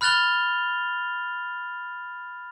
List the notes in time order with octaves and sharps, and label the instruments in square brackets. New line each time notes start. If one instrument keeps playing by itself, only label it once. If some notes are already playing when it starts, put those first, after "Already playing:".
[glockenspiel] B5 F6 F#6 A6 F7 G7